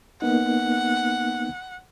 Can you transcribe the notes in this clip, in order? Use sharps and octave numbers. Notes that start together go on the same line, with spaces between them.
A#3 B3 D#4 F#5